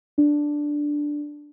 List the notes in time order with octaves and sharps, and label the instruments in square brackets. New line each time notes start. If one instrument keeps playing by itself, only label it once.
[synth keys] D4